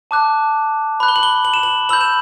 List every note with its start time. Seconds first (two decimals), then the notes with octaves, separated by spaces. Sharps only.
0.11 A5 D6 F#6
1.00 B5 F#6
1.08 G7
1.16 F#7
1.23 G7
1.45 F#7
1.54 E7
1.63 F#7
1.89 B5 E6 G6 F#7
2.01 E7